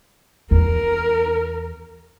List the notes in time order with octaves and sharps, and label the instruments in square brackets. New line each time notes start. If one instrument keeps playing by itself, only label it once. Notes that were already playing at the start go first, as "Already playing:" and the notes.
[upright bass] E2 [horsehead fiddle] A#4